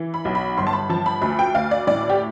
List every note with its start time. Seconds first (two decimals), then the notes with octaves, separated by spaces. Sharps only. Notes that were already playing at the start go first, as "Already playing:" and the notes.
Already playing: E3
0.14 B5
0.25 B1
0.35 B5
0.57 G1 C6
0.67 A5
0.73 B5
0.89 F3 A5
1.06 B5
1.21 D2 B5
1.39 G5
1.54 D2 F5
1.71 D5
1.87 A2 D5
2.10 G4